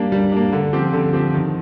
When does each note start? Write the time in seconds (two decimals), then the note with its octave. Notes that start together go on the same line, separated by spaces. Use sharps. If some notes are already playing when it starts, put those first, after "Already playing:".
Already playing: G3 A#3 D4
0.12 G3
0.32 A#3 D4
0.52 D3
0.73 F3 C4 G4
0.93 D3
1.13 F3 C4 G4
1.34 D#3